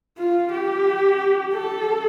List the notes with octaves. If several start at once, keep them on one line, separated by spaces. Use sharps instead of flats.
F4
G4
A4